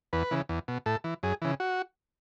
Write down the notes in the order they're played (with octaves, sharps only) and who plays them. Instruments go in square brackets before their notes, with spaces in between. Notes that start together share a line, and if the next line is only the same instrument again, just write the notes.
[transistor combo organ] E2 B4
C#3 E3
E2
B2
A2 A4
E3
F#2 G#4
C#3 E3
F#4